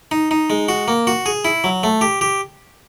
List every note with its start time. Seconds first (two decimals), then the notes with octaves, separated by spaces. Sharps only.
0.11 D#4
0.31 D#4
0.50 G#3
0.69 F#4
0.88 A#3
1.07 F#4
1.26 G#4
1.45 E4
1.64 F#3
1.83 A3
2.01 G4
2.21 G4